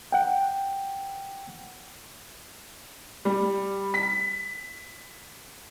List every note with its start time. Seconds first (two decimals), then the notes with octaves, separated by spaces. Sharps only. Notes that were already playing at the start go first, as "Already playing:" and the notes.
0.12 F#5 G5
3.25 G3
3.94 B6